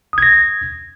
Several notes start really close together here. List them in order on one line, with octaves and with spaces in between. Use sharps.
D#6 G#6 A#6